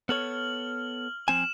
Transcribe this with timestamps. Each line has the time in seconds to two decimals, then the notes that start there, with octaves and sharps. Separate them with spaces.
0.09 B3 A4 C#5 F6 F#7
1.28 F3 C4 G#5 E7